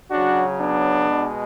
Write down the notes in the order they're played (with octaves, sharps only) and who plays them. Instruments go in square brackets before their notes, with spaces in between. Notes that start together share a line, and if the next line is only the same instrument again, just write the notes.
[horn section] C#3 F#3 D4 F#4
B3 D4
B2 G#3